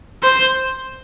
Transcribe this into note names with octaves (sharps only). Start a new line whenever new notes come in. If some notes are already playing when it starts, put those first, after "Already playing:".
C5